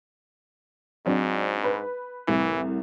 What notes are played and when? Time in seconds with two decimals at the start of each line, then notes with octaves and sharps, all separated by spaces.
1.06 G#2 F#3 C4 D4
1.64 B4
2.28 C2 A2 E3